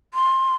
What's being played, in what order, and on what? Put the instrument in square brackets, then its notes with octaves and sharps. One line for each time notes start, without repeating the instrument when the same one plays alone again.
[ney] C6